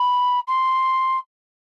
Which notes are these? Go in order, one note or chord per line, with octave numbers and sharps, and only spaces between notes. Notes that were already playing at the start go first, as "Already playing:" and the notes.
Already playing: B5
C6